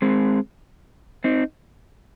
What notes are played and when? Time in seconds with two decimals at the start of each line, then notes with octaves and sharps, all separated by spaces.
0.02 G#3 C4
1.24 C4 D#4